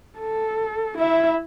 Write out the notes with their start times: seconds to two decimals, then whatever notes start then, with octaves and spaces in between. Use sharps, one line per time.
0.19 A4
0.98 E4 E5